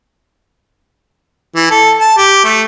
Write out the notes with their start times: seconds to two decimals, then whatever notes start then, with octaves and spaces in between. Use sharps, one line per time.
1.56 E3
1.71 A4
2.01 A5
2.18 G4
2.44 A3